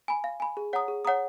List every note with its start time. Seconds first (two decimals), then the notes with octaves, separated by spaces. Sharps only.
0.08 G#5 B5
0.24 F5
0.40 G#5 B5
0.57 G#4
0.73 C#5 F#5 A#5 D#6
0.88 G#4
1.05 C#5 F#5 A#5 D#6